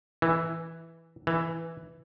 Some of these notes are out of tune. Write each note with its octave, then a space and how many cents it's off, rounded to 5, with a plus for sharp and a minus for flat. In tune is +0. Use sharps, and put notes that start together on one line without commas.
E3 -5
E3 +0